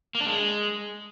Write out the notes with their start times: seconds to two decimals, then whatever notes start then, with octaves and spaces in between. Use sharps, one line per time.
0.15 A#3
0.21 D4
0.26 G#3